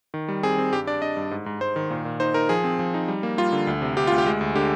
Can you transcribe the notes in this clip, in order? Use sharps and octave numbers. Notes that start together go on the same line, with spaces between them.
D#3
G3
C4 G#4
C4
G2 G4
D4 D5
D4 D#5
G2
G#2
G#2
G#2 C5
D#3
A#2
A#2
D#4 C5
D#4 A#4
F3 G#4
C4
F3
D#4
G3
A#3
G3 F4
D3
D2
C3
D2 G4
D2 F4
G4
G#3
D2
D3 G4